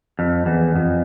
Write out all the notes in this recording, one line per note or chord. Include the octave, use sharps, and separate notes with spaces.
F2
E2
F2